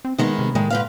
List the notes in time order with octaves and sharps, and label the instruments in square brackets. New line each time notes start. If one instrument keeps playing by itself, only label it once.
[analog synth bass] C4
[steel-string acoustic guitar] D#3 G#3 B3 [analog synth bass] D#4
[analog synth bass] C3
[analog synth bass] A2 [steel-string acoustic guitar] D#3 G#3
[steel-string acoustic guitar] G#2 B4 F5